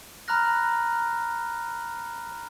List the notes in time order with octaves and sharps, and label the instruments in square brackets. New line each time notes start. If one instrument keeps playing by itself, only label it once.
[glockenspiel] A#5 B5 F6 F#6 A#6